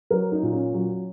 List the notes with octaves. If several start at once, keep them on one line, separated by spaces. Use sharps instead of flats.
F#3 A#4
D#4
A#2
C#4
F#3